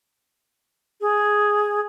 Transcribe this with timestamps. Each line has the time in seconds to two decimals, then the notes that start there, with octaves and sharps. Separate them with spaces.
1.01 G#4